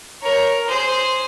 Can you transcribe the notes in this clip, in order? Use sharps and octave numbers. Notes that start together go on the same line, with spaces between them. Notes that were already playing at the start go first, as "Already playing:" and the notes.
A#4 C#5
G#4 C5